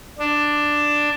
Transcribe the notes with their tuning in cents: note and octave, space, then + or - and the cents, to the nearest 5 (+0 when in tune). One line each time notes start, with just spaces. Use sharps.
D4 +5